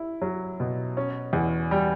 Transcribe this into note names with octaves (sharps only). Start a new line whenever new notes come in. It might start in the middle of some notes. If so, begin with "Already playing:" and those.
Already playing: E4
F#3
B2
C#4
E2
G3